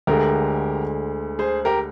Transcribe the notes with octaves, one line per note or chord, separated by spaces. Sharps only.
D2 D3 G#3 G4 A#4
G#4 C5
G4 A#4